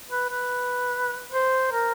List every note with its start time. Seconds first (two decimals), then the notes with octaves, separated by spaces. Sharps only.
0.10 B4
0.30 B4
1.31 C5
1.71 A#4